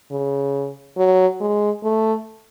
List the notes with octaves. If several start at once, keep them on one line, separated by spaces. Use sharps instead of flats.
C#3
F#3
G#3
A3